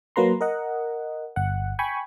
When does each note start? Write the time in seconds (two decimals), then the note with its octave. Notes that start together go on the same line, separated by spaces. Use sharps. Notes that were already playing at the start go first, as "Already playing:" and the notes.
0.16 F#3 A#3 B4 A#5 C6
0.41 A#4 D#5 F#5
1.36 G1 F#5
1.79 G5 G#5 B5 C#6